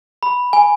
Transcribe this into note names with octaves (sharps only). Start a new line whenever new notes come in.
B5
G#5